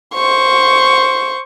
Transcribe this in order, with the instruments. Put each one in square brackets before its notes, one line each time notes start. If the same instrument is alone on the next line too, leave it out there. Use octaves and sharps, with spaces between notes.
[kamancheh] C5 C#6